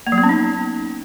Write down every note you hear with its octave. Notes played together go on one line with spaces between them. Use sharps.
A#3
F#3
B3
C#4
D#4